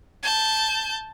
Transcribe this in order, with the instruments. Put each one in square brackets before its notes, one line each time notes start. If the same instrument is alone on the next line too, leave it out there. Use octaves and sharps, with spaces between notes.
[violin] A5 G6